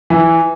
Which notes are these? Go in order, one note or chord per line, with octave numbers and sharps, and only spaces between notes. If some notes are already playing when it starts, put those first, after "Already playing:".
E3